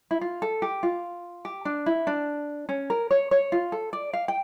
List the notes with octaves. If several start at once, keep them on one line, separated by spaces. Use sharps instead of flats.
E4
F4
A4
G4
F4
G4
D4
E4
D4
C#4
A#4
C#5
C#5
F4
A4
D5
F5
G5